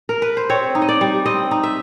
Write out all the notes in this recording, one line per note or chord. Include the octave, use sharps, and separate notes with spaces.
A#4
B4
C5
C4 C#5
D#4
D#5
D5
G3
C4 D#5
D#4
E5